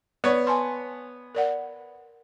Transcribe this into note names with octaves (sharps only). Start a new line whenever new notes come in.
B3 C#5 D5
G#5 A5 C6
A#4 D5 F#5